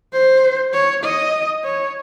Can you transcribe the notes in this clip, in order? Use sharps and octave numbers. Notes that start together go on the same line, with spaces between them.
C5
C#5
D#5
C#5